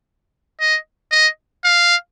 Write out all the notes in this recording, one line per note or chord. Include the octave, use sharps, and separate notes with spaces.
D#5
D#5
F5